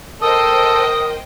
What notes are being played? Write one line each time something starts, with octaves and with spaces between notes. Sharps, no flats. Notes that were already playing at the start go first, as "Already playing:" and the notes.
A4 A#4 C5 D#5 G5 D#6